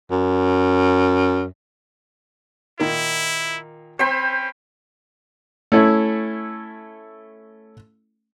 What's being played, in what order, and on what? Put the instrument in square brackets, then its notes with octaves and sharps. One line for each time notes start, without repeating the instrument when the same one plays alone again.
[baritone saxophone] F#2
[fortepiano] A#2 D#3 A#3 [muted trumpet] E4
[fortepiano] C4 [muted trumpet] C#4 [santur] C5 G5 B5
[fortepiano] A3 C#4 E4